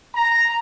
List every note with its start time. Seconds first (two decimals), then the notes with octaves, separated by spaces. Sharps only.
0.13 A#5